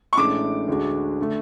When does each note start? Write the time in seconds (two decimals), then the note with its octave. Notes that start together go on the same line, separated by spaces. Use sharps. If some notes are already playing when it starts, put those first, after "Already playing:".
0.13 C#6
0.17 A1 A2 G#3 D4 D6
0.68 D2 D3 G#3 D4 F#4
1.21 D3 A3